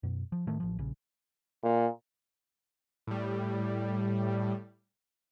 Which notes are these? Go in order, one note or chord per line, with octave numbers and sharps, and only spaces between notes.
F#2 B2
F3
A2 D#3 A3
A1 F3
A#1 C#3
A#2
A2 G3